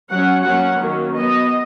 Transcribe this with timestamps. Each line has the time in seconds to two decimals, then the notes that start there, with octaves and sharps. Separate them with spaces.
0.10 F#3 C#4 F#5
0.45 F#3 A#3 C#4 F#5
0.79 D#3 F#3 A#3 C#4
1.14 F#3 B3 D#5